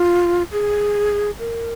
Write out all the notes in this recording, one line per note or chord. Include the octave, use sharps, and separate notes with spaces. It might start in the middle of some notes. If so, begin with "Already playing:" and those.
Already playing: F4
G#4
A#4